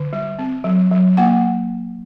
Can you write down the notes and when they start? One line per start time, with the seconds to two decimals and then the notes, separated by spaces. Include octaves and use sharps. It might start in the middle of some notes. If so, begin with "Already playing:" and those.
Already playing: D3
0.13 G3
0.39 C4
0.64 F#3
0.91 F#3
1.17 A#3 F#5